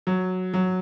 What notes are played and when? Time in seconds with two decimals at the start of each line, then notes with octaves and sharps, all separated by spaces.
0.07 F#3
0.54 F#3